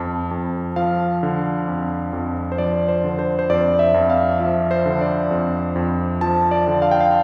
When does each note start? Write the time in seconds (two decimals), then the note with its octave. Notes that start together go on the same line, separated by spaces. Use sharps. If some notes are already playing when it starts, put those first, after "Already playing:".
Already playing: F2 A5
0.31 F2
0.76 F3 F5
1.23 D3
1.68 F2
2.13 F2
2.52 C5
2.58 F3 D5
2.88 C5
3.04 D3
3.19 C5
3.39 C5
3.50 F2 D5
3.79 E5
3.94 F2
4.10 F5
4.40 F3 E5
4.71 C5
4.86 D3
5.01 D5
5.31 F2
5.76 F2
6.21 F3 A5
6.51 D5
6.67 D3
6.82 F5
6.91 G5
7.01 F5